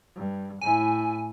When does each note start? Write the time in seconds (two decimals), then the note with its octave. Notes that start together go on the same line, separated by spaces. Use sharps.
0.15 G2
0.61 A2 E4 G#5